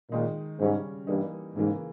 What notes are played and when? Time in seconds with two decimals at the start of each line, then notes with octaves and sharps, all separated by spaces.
0.11 A#2 D#3 G#3 D#4
0.59 G#2 C#3 G3 C#4
1.07 G2 E3 G3 A#3 D#4
1.56 G#2 C#3 E3 A#3